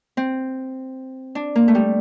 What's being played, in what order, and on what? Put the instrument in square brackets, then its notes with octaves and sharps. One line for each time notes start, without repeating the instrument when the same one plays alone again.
[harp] C4
D4
A#3
A3
G3